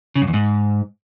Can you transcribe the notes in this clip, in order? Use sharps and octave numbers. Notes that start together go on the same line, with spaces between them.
C#3
F#2
E2
G#2